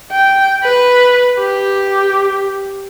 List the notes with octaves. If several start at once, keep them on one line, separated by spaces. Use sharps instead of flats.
G5
B4
G4